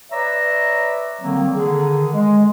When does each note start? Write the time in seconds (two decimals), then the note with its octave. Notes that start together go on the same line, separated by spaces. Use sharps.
0.12 B4 C#5 D5 E5 A#5
1.21 D3 D#3 F#3 G3 A#3 C4
1.52 D3 D#3 G#4
2.13 G#3